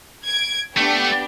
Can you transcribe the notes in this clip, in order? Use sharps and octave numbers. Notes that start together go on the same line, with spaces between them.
G#6 D7
A3 B3 D4 G4